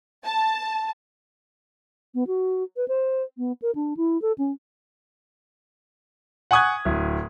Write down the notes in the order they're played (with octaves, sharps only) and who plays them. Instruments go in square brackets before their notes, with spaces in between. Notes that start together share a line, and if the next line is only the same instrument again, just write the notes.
[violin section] A5
[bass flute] B3
F#4
B4
C5
B3
A#4
D4
E4
A4
C#4
[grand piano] F#5 G#5 C#6 D#6 F#6 G#6
D1